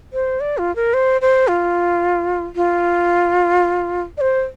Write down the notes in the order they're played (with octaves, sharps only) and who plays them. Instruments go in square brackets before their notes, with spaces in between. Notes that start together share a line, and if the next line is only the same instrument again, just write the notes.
[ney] C5
D5
F4
A#4
C5
C5
F4
F4
D5
C5